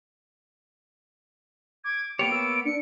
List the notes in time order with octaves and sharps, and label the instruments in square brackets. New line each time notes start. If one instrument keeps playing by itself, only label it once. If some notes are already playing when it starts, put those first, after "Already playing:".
[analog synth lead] D6 [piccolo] G#6
[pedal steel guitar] A#3 B3 C#5 [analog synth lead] G4 [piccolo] D7
[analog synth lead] E6
[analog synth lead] D4 [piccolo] C#7